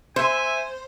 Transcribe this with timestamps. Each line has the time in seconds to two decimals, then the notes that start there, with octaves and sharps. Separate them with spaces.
0.16 C5 E5 G#5